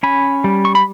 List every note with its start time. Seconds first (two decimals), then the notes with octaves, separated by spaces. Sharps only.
0.03 C#4 G#5 B5
0.44 G3
0.65 C#6
0.75 B5